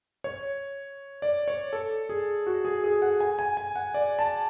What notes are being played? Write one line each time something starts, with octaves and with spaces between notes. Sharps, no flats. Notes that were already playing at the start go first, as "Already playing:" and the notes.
C#5
D5
C#5
A4
G#4
F#4
G#4
G#4
F#5
G#5
G#5
G#5
F#5
D5
A5